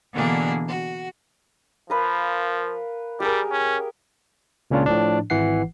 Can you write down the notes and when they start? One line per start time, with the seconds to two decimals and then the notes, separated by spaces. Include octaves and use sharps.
0.12 B2 D3 E3 A#3 D4 G#4
0.68 F#4
1.90 F3 A#4 B4 F5
3.20 G3 G4 G#4 A#4
3.51 C#4
4.71 C#2 A#2 C#3 C#4 D4 F4
4.86 A2 F3 D4
5.30 G#1 E3 F#5 C7